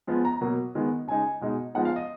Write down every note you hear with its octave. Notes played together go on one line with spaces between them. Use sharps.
F3 G#3 B3
A#5
B2 F#3 A#3
D#3 G#3 B3
C#3 G#3 D#4 G#5
B2 G#3 D#4
F3 G#3 B3 D#4 F#5
F5
D#5